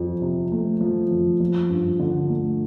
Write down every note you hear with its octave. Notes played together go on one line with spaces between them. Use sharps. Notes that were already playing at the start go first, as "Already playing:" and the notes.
Already playing: F2 F3
C3
A3
F3
F2
F3
G2
D3
A3